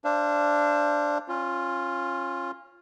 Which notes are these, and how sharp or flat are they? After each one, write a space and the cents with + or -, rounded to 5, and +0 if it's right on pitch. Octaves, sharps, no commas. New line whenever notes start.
D4 +0 C5 +15 F5 -35
C#4 -25 F4 +0